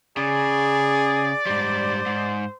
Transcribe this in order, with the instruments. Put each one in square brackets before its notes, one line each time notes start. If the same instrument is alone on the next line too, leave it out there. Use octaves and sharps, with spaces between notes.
[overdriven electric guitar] C#3 [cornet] G#4 [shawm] D5
[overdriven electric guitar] G#2 G3 [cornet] C5
[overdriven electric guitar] G#2